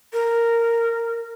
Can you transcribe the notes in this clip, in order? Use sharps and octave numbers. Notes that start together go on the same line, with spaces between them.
A#4